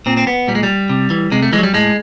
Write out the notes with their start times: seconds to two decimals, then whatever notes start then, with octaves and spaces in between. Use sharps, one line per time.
0.06 A#2 C4
0.17 C4
0.27 B3
0.48 A#2 G3
0.55 G#3
0.63 G3
0.89 C3
1.10 E3
1.32 C3 G#3
1.43 A3
1.53 E3 G#3
1.58 F#3
1.63 G3
1.74 A2 G#3